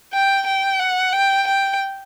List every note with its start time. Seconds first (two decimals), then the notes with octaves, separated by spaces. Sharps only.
0.13 G5
0.46 G5
0.80 F#5
1.13 G5
1.47 G5